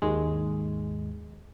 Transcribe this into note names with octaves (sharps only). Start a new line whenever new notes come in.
D#2 G#2 G#3